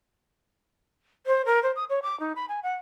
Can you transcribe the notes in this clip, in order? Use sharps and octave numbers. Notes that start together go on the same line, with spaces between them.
C5
A#4
C5
D#6
C#5
D6
D#4
B5
G#5
F#5